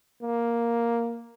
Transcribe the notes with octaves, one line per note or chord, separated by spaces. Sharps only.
A#3